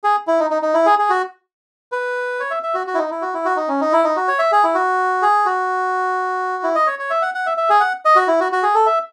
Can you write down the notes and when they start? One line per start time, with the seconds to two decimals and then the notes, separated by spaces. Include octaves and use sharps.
0.04 G#4
0.27 E4
0.40 D#4
0.50 D#4
0.62 D#4
0.74 E4
0.86 G#4
0.99 G#4
1.10 F#4
1.92 B4
2.40 C#5
2.51 E5
2.63 E5
2.74 F#4
2.87 F#4
2.94 E4
2.98 D#4
3.11 E4
3.22 F#4
3.34 E4
3.45 F#4
3.57 D#4
3.68 C#4
3.81 D#4
3.93 E4
4.04 D#4
4.16 F#4
4.28 C#5
4.39 E5
4.52 G#4
4.64 E4
4.75 F#4
5.22 G#4
5.45 F#4
6.63 E4
6.75 D#5
6.87 C#5
6.99 C#5
7.10 E5
7.22 F#5
7.34 F#5
7.46 E5
7.57 E5
7.70 G#4
7.80 F#5
8.05 D#5
8.16 F#4
8.28 E4
8.40 F#4
8.52 F#4
8.63 G#4
8.75 A4
8.86 E5